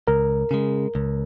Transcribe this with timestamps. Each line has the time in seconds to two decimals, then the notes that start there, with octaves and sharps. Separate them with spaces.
0.08 C#2 A#4
0.51 C#3 G#3
0.95 C#2